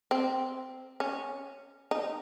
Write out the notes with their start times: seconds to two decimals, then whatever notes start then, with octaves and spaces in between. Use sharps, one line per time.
0.11 C4
1.00 C#4
1.91 D#4